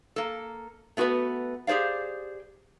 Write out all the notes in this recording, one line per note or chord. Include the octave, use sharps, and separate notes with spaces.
A#3 A4
A3 B3 F#4 G4 B4
G4 G#4 C5 D5 F5